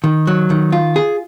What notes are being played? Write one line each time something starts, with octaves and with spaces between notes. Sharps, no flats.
D#3
F#3
D#3
F4
G#4